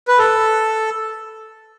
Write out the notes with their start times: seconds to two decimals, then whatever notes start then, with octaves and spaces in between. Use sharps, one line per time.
0.08 B4
0.18 A4